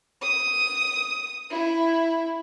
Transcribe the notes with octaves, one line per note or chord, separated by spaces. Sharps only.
D#6
E4